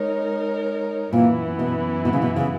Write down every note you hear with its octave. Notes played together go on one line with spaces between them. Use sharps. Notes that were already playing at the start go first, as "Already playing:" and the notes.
Already playing: G#3 D#4 A#4 C#5
F#2 A#2 E3 B3 E4
B2
B2
C#3
B2
C#3